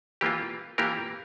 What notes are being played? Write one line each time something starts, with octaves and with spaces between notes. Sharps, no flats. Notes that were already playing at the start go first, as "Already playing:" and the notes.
E3 A#3 F4 G4
E3 A#3 F4 G4 A#4